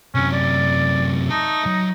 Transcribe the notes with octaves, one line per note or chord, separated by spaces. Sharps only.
F#2 C3 C#4
D5
D#4 E5 A5
F#3